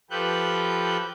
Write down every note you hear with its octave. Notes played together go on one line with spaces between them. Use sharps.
F3 G4 A4 B4 F#6 G6